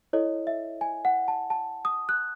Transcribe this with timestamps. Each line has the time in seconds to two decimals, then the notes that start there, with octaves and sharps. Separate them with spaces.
0.13 E4 A4 C#5 D#5
0.47 E5
0.81 G#5
1.05 F#5
1.28 A5
1.50 A5
1.85 D#6
2.09 F#6